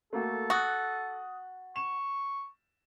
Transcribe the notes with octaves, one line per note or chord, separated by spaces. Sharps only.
A3 A#3 F#4 A4
F#4 D#6 F#6 A6
C#6 E7